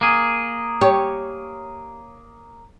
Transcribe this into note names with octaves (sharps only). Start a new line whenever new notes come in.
A#3 G#4
G4 C#5